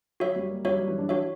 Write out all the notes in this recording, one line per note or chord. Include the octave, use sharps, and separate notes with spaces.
F#3 F#4 C#5 E5
G3
A#3
G3 F#4 C#5 E5
F#3
E3
D4
F#4 C#5 E5